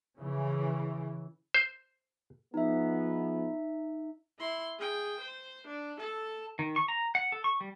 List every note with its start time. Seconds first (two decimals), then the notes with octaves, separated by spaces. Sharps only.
0.18 C#3 E3
1.54 C5
2.54 F3 G#3 B3 D#4 E5
4.39 E4 C6
4.78 G#4 G5
5.21 C5
5.68 D4
5.99 A4 A5
6.59 D#3
6.76 C#6
6.88 A#5
7.15 F#5
7.32 A4
7.44 C#6
7.61 G3